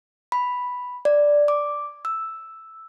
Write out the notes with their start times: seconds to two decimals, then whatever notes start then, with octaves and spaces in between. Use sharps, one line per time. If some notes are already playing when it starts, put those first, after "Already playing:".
0.32 B5
1.05 D5
1.48 D6
2.05 E6